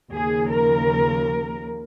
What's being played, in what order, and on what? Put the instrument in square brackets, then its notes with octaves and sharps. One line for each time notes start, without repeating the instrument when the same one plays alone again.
[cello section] D#2 C#3 F3 G#4
A#4